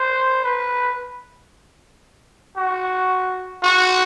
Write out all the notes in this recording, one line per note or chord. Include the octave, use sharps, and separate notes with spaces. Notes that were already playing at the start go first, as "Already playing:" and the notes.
Already playing: C5
B4
F#4
F#4